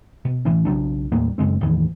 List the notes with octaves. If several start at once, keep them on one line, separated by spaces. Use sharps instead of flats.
B2
A1 E3 C#4
B1 C#3 F#3 D4
D#2 A2 G3 A#3
F#2 C#3 G#3 C4
A1 E2 D#3 E3